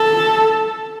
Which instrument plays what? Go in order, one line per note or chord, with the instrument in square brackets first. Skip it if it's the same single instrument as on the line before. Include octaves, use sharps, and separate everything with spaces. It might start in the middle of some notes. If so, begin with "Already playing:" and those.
Already playing: [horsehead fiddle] A4